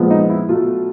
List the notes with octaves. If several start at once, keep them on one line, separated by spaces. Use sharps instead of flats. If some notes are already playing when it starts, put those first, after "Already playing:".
Already playing: A#2 F3 G#3 B3
D#4
E4
B2 F#3 A3 F4